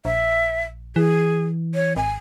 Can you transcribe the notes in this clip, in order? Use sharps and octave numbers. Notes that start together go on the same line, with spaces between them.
A#1 E5
E3 G#4
C#5
G#1 G#5